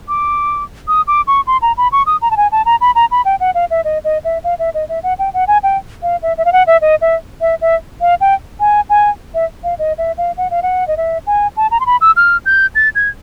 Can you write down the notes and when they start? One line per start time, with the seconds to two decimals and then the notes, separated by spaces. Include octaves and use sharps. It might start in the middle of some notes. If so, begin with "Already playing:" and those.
0.08 D6
0.88 D#6
1.08 D6
1.27 C#6
1.47 C6
1.62 A#5
1.77 B5
1.92 C#6
2.06 D#6
2.22 A#5
2.31 A5
2.37 G#5
2.52 A5
2.66 A#5
2.81 B5
2.95 A#5
3.11 B5
3.25 G5
3.40 F#5
3.55 F5
3.71 E5
3.85 D#5
4.04 D#5
4.24 E5
4.44 F5
4.59 E5
4.74 D#5
4.89 E5
5.03 F#5
5.19 G5
5.34 F#5
5.48 G#5
5.63 G5
6.02 F5
6.23 E5
6.38 E5
6.45 F5
6.53 F#5
6.67 E5
6.82 D#5
7.01 E5
7.41 E5
7.61 E5
8.01 F5
8.21 G5
8.60 G#5
8.90 G#5
9.34 E5
9.64 F5
9.79 D#5
9.98 E5
10.18 F5
10.38 F#5
10.51 F5
10.63 F#5
10.88 D#5
10.97 E5
11.27 G#5
11.57 A5
11.71 A#5
11.80 C6
11.86 B5
12.01 E6
12.16 F6
12.46 G6
12.75 A6
12.95 G#6